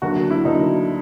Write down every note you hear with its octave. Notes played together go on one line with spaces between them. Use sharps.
D2 D3 F#3 A#3 F#4
E4
D2 D3 F#3 A#3 D#4